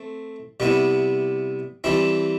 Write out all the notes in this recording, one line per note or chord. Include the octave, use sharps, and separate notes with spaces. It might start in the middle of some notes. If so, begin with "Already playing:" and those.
Already playing: A3 C4
C3 G3 B3 E4
E3 G3 C4 E4